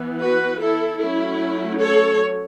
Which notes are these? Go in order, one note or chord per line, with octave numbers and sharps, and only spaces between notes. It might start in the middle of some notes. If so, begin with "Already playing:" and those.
Already playing: E3 B3
F#4 B4
E4 A4
F#3 A3 C#4 E4
A4 C#5